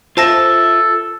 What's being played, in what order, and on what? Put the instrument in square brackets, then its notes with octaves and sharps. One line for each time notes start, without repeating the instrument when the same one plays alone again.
[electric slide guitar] F4 E5 [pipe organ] A4 [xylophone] C5 A5 A#6